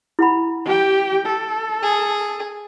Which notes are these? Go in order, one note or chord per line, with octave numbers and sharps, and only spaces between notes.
E4 F#5 B5
G4 G5
A4
G#4